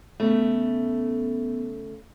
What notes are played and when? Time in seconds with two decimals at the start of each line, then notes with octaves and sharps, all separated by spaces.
0.20 C#3 A3 B3